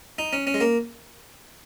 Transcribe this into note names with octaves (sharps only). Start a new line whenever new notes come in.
D#4
C#4
C#4
G#3
A#3